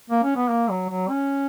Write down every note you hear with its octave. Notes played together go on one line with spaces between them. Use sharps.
A#3
C#4
B3
A#3
F#3
F#3
C#4